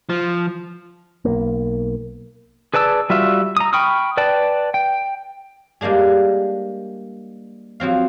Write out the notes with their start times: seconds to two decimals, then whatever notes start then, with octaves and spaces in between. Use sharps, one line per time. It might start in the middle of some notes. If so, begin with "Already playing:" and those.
0.09 F3
1.25 B1 A#3
2.74 G#4 B4 D5 A5 E6
3.10 G3 F4 F#4 E5
3.57 A#5 D#6
3.73 G5 B5 C#6 D#6 F6
4.17 B4 D5 G5 A5
4.74 G5
5.81 G3 G#3 A#3 D4 G#4
7.80 F3 F#3 C4 F5